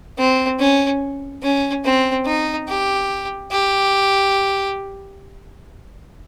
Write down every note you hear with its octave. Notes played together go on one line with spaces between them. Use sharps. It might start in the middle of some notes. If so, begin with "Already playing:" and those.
C4
C#4
C#4
C4
D#4
G4
G4